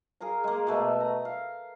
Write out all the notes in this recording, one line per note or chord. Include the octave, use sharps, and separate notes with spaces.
G#4 A#4 F5 A#5
G#3 A#3
B2 A3 B3 E5
A#5
F5